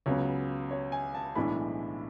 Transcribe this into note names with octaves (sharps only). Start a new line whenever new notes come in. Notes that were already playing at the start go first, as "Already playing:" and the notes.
C#2 C#3 F#3 B3 C#5
C#5
G#5
A5
B1 A2 E3 G#3 D4 B5